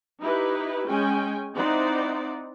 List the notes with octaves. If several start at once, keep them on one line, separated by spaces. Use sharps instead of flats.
D#4 E4 G4 B4
G#3 C#4 G5 G#5
C4 D#4 E4 C5 D5 F#5